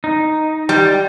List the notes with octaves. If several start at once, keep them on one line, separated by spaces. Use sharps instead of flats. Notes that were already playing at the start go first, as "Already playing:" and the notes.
D#4
G3